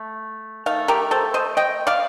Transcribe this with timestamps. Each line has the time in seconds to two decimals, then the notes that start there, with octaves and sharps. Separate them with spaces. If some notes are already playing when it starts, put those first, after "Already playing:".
Already playing: A3
0.66 D#3 A3 F5
0.88 G4 A#4
1.11 A4 C5
1.34 C5 D#5
1.57 D#5 G5
1.87 D5 F5